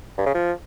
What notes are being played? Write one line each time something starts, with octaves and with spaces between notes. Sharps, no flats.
G2
C#3
F3